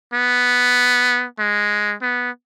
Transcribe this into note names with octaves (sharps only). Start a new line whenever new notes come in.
B3
G#3
B3